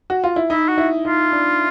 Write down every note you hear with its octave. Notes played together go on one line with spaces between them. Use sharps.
F#4
F4
E4
D#4 E4
F#4
E4
D#4 F4
D4